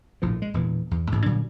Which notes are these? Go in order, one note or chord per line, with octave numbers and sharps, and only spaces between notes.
A#1 A2 F3
G#3
E1 A#2 E3
E2
A1 G#2
A#2 D3 F#3 G3